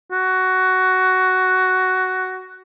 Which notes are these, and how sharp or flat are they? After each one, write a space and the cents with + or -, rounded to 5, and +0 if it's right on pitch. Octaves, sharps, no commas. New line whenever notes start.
F#4 +10